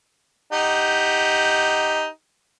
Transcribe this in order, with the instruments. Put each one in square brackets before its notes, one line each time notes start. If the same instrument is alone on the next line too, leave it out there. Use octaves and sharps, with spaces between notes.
[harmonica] D#4 G4 F#5